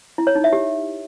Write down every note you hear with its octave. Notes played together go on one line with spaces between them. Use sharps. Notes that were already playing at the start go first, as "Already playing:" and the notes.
E4
C#5
D#4
E5
G4